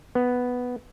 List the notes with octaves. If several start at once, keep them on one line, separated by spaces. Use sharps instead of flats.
B3